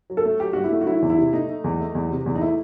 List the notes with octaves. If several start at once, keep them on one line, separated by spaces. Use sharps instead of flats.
F#3
A4
A3
F#3 G4
G2 F#4
E4
A3
F#4
F#3 E4
E2
E4
C3
A3 D#4
A3
E2
A3
E2
C3
E2
D#4
A3 E4